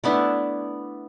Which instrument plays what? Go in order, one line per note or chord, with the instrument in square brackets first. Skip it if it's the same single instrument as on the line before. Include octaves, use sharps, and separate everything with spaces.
[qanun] A3 B3 D4 E4